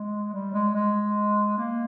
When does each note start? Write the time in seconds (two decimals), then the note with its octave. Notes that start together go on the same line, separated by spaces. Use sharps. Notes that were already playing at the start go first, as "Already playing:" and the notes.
Already playing: G#3
0.33 G3
0.54 G#3
0.74 G#3
1.58 A#3